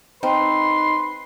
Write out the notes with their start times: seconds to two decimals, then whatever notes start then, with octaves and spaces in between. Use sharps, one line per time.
0.23 C4 D#4 B4 C6